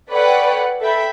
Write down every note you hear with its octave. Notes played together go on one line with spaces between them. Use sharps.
A4 B4 C#5 D5 F#5 G5
A4 E5 G5 B5